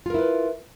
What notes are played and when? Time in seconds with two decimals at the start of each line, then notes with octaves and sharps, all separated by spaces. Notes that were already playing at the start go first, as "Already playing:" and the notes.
0.06 F4
0.10 A#4
0.14 E4
0.19 B4